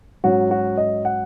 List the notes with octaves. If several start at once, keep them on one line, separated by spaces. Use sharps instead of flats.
G#2 F#3 C#4 F#4
F#4
D#5
F#5